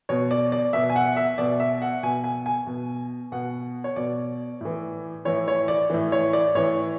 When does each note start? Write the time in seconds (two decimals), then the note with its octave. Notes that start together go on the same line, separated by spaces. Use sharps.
0.09 B2 C#5
0.31 D5
0.52 D5
0.73 B2 E5
0.90 G#5
0.96 F#5
1.17 E5
1.38 B2 D5
1.60 E5
1.82 F#5
2.03 B2 G#5
2.24 G#5
2.46 G#5
2.67 B2
3.32 B2 F#5
3.84 C#5
3.96 B2 D5
4.61 A2 E3
5.25 A2 E3 C#5
5.48 C#5
5.68 D5
5.90 A2 E3
6.12 C#5
6.33 D5
6.55 A2 E3 C#5